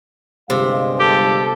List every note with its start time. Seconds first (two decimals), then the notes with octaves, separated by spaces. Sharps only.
0.50 G1 C3 G#3 F5
1.00 G4 A4